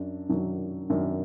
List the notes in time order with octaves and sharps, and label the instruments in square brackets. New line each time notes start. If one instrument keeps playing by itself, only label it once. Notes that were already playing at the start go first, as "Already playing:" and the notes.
Already playing: [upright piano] F#2 F#3 D4
F#2 D#3 F#3 D4
F#2 D#3 F#3 D4